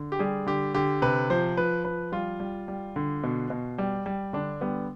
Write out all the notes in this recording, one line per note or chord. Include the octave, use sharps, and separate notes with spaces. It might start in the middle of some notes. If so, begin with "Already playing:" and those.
Already playing: D3
G4
G3 G#4
D3 G4
D3 G4
C3 B4
F3 C5
F3 B4
F3 B4
G3 F4
G3
G3
D3
B2
B2
G3
G3
D3 D4
G3 B3